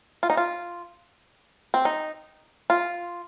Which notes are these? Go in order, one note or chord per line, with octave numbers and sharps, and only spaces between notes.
F4
D#4
F4
C4
D#4
F4